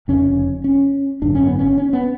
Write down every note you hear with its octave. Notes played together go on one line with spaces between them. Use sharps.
F1 F2 C#3 C#4
C#4
G#1 F#2 D3 D4
C#4
B3
C#4
C#4
B3